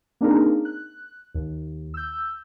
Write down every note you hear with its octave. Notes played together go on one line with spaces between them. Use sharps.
A#3 C4 D4 D#4 G#4 A#4
F#6
D#2
E6 G6